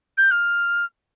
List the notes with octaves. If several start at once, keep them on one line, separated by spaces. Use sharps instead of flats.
G6
F6